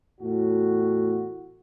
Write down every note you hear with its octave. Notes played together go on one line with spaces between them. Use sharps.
E2 A2 F#4